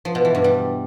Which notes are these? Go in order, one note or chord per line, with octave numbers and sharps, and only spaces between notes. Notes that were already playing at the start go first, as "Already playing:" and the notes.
F3
B2
E3
G2
G3